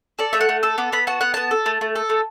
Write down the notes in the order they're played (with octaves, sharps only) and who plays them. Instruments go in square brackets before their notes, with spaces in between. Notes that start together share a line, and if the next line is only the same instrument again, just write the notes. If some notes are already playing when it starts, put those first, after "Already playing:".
[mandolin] A4 D5
A3 E5
F#5
A3
A4 E6
B3 D6
B3 B5
F#4 A5
B3 F#5
B3 A5
A4
A3
A3
A4
A3